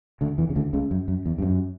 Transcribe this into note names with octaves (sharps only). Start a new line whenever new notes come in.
D2 D3
E2 E3
C#3
D2 D3
C#2 C#3
F#2
F#2
E2
G2
F#2